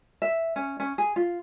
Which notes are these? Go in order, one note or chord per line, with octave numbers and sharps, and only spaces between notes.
E5
C#4
C#4
G#4
F4